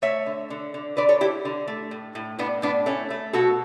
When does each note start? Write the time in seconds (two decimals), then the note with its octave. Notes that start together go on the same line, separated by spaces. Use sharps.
0.02 A3 C#5 E5
0.26 D3
0.50 D3
0.74 D3
0.97 D3 B4 D5
1.09 A4 C#5
1.21 D3 E4 G4
1.45 D3
1.68 A3
1.91 A2
2.15 A2
2.39 A2 B3 D4
2.62 A2 B3 D4
2.86 A3 C#4
3.10 A3
3.33 B2 F#4 A4